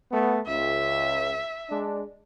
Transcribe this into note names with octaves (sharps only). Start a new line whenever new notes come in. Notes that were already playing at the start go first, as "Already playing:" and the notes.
A3 B3
C#2 E5
G#3 D4